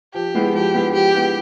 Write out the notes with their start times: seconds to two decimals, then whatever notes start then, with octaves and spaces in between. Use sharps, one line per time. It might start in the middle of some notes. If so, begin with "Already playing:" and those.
0.14 F3 G4
0.35 G#3 B3 E4
0.54 F3 G4
0.74 G#3 B3 E4
0.94 F3 G4
1.14 G#3 B3 E4